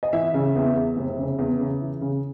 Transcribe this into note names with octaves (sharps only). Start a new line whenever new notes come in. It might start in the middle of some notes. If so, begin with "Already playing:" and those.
D#5
E3 E5
C#3
E2
E2
F1
C#3
E2
C#3
E3
C#3